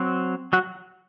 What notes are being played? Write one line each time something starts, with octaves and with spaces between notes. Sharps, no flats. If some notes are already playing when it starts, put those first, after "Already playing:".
Already playing: F#3 C4
F#3 F#4